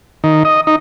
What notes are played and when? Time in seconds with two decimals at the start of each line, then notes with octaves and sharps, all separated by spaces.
0.24 D#3
0.45 D#5
0.67 D#4